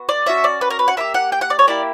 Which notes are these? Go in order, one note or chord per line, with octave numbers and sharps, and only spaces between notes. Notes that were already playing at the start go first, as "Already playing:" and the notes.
Already playing: B3 F#4
D5
C#4 F#4 E5
D5
B4
A#4
B4
F#5
A#3 E4 G4 E5
F#5
G5
F#5
D5
C#5
A#3 E4 G4 D5